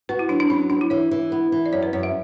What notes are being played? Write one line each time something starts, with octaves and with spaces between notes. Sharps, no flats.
F#4 B4
E4
F#3 D4
D4
F#3 C#4
B3 D4
E4
E3 C#5
E3
B3
E3
D5
F#2 C#5
B4
F#2 C#5
E5